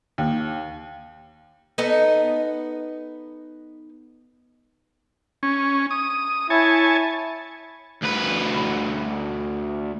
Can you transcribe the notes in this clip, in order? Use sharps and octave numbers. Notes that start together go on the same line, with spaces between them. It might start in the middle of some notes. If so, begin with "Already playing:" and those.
D#2
B3 D#4 A4
C#4
D#6
E4 C#5 G#5 A5
D2 B4